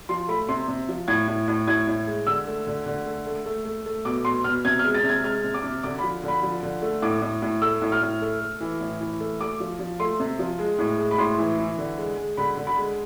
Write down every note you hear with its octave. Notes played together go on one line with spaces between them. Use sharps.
F3 C6
A3 B5
C3 C6
C3
F3
A2 G#6
A2
A2
A2 G#6
A2
G#3
D3 E6
A3
D3
D3
A3
A3
A3
A3
A3
B2 D6
B2 C6
B2 F6
C3 G#6
F6
G#3
A6
C3
G#6
G#3 F6
C3
D6
C3
D3 D6
B5
F3
D3 B5
F3
D3
A3
A2 D6
A2
A2
A3 E6
A2
F6
A2
A3
A3
E3
A2
E3
A3
A3 D6
F3
F3
A3 C6
C3
F3
G#3
A2
G#3
B5
A2 C6
E3
E3
D3
G#3
G#3
D3 B5
D3
B5
G#3